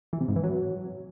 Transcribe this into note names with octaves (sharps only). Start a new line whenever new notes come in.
E3
C3
G#2
E3
F#3